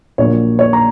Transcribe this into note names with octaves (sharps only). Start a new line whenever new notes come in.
A#1 A#2 F#3 A#3 C#5
C#5
A#5